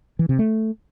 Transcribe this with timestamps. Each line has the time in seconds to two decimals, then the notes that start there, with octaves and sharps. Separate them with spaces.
0.19 E3
0.29 C3
0.39 A3